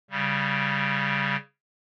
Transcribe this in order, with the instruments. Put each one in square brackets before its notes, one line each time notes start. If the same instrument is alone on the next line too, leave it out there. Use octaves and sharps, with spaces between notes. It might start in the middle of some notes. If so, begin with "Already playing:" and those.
[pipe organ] C#3 G3